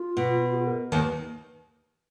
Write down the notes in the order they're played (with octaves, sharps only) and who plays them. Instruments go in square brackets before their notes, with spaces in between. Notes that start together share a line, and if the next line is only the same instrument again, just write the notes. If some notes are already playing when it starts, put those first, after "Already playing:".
Already playing: [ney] F4
[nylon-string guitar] B2
[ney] G#4
A#4
[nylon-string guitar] D#2 D#3 [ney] A#4
[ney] B4